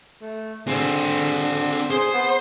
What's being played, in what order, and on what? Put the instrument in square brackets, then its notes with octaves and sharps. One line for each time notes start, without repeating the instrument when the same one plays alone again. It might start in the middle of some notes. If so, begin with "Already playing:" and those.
[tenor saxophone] A3
[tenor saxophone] D3 [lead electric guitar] C4 G#4
[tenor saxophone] G#4 [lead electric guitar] C5
[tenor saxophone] B3